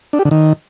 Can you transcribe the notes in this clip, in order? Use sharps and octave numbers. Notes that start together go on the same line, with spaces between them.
D4
G4
D3
D#3